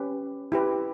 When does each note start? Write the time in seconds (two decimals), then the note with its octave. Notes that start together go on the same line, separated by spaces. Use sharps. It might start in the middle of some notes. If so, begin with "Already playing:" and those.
Already playing: C#4 G4 B4
0.52 E4 G4 B4